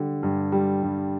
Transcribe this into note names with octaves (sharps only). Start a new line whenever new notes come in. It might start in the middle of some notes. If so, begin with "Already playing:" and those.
Already playing: D3 G3
G2
G3
G2